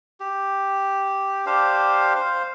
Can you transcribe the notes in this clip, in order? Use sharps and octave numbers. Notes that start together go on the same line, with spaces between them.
G4
D4 G4 C5 F5
C5 F5